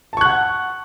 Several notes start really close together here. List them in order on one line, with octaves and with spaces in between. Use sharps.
A5 C#6 F#6 F#5